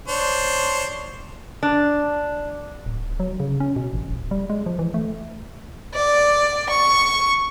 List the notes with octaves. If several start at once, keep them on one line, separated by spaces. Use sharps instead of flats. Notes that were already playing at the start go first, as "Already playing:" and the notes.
D4 C5 C#5
D4
D1
F#3
C#3
C#4
B2
A1
D#1
G3
G#3
F3
E3
A3
D5
C#6